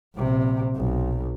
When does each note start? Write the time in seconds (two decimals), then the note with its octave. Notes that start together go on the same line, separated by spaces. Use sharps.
0.16 A#1 C3
0.76 B1